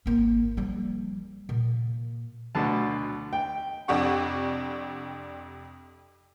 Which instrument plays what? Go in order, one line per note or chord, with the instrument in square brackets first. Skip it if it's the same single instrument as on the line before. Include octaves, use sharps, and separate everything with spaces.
[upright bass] G#1 A#3
F3 G3
A#2
[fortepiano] D2 B2 D3 A5
G5
[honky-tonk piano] F2 C3 D4 G4 F#5 C#6